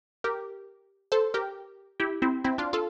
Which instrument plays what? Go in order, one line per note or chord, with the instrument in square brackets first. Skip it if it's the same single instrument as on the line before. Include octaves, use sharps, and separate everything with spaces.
[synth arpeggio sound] G4 A#4
A4 C5
G4 A#4
E4 G4
C4 E4
C4 E4
D4 F4
F4 A4